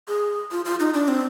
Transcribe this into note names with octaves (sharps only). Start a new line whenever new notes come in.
G#4
F4
F4
D#4
D4
C4